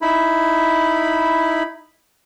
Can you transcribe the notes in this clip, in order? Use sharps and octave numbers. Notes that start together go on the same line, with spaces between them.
D#4 E4 B5